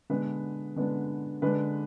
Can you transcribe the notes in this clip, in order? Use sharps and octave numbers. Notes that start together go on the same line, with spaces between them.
D3 G#3 B3 D4 B4
D3 G#3 B3 D4
D3 G#3 D4 B4